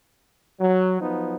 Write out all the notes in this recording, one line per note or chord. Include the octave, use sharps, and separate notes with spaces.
F#3
F3 F#3 B3 D#4